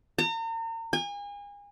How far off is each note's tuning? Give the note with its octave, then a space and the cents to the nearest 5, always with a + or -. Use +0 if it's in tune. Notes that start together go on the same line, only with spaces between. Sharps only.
A#5 -40
G#5 -35